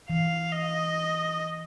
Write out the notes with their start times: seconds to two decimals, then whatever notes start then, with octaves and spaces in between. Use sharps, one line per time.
0.09 E3 F5
0.53 D#5